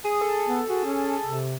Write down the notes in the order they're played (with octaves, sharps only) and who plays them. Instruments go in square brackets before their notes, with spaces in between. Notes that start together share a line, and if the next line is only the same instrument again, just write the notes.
[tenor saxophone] G#4 [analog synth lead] D#6
[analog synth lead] A4
[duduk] B3
[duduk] F#4 [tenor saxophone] G#4
[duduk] C#4
C3